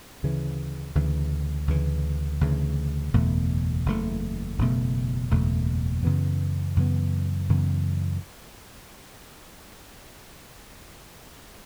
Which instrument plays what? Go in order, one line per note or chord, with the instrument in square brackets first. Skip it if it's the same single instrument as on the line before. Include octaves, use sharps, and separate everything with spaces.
[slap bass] D2 C#3 E3
D2 C#3 E3
D2 C#3 E3
D2 C#3 E3
F#1 E2 B2 A3
F#1 E2 B2 A3
F#1 E2 B2 A3
F#1 E2 B2 A3
F#2 C#3 E3 B3
F#2 C#3 E3 B3
F#2 C#3 E3 B3